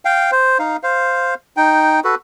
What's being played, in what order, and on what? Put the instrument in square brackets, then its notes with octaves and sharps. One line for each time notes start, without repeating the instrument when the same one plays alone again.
[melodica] F5 G5
C5
D#4 F5
C5 F5
D#4 G5
F#4 A4 B4